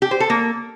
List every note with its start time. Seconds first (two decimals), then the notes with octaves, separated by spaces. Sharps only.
0.02 G4
0.11 C5
0.20 A4
0.30 A#3